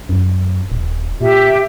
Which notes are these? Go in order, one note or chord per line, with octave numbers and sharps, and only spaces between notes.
F#2
D#1
A#2 G4 E5